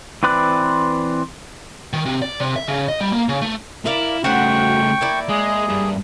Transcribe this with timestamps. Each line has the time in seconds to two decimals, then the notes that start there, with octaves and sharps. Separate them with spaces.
0.23 E3 C4 B4 D5 F#6
1.93 D#3
2.06 C3
2.22 D5
2.40 C3
2.56 E5
2.68 C#3
2.88 D#5
3.01 G3
3.13 A#3
3.29 C#3
3.42 A3
3.86 E4 A#4 D5 F5
4.24 C#3 A3 F#4 C5 F#5 G5 C#6
5.01 A#3 E4 D5
5.29 G#3 G#4
5.68 G2